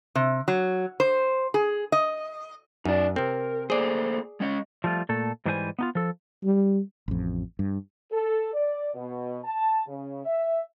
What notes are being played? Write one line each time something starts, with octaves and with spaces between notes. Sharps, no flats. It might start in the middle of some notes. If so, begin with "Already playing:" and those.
C3
F#3
C5
G#4
D#5
F#2 D#4 D5
C3 C4 A#4
A3 A#3 G#4 C5 D5
G#3 C#4 D#5
F3 G3 A3 F4
A#2 A3 A4
G#2 E3 G3 G#4 C5 G#5
B3 D#4 F4
F3 A4
G3
A1 F2
G2
A4
D5
B2
A5
C#3
E5